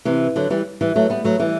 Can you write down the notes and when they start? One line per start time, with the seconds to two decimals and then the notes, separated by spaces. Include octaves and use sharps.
0.05 C3 E3
0.36 D3 F#3
0.50 E3 G3
0.81 E3 G3
0.96 F#3 A3
1.10 G3 B3
1.24 F#3 A3
1.40 E3 G3